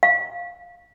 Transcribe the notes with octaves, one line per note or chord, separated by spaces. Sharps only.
F5